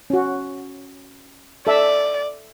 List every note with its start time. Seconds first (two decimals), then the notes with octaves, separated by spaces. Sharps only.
0.10 C#4 F#4
1.67 A4 D5 E5